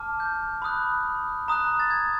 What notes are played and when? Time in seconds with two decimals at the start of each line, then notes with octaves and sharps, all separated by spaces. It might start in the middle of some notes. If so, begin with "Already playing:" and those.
Already playing: A5 D6 F6
0.20 G6
0.62 B5 D#6 F#6
1.48 A#5 D#6 F#6
1.80 A6
1.91 G#6